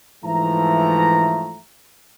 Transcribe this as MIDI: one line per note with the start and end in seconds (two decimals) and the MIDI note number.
0.25 1.59 44
0.25 1.59 52
0.25 1.59 53
0.25 1.59 57
0.25 1.59 76
0.25 1.59 82